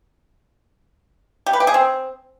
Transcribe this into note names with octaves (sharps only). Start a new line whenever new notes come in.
G4
B4
G4
G#4
C4